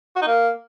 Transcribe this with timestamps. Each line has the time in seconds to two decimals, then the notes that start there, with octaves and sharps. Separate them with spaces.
0.16 F#4
0.22 D#4
0.27 A#3